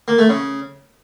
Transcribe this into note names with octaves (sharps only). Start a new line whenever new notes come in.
A#3
A3
C#3